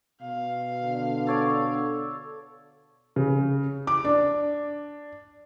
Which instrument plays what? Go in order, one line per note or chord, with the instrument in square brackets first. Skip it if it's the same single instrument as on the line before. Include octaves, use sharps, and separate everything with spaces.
[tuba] B2 [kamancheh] F5
[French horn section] D3
[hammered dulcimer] A4 C#5 D5
[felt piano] C#3
D6
D4